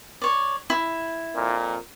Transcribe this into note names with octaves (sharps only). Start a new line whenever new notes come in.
C#5 D5
E4
F2 A#2